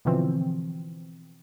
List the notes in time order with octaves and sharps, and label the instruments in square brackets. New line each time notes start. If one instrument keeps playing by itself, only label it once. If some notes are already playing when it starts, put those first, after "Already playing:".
[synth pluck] B2 D3 E3 F3 C4